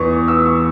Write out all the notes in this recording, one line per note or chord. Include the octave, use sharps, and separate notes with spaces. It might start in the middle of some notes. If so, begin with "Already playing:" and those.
Already playing: E2 E3 B3 C#6
E6
C#6